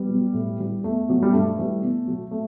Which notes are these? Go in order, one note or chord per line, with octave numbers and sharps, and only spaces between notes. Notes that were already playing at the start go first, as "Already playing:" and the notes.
Already playing: G3 B3
B2 F#3
A2
E3 G3
E2 A3
B2 F#3
G3
G2 A3
E3 G3
B2
F#3
A3